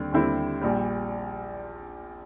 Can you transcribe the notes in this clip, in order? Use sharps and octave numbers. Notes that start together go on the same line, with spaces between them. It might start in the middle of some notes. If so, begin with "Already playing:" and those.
Already playing: D#2 D3 G3 C4
D#2 D3 G3 C4 E4
A#1 A#2 G3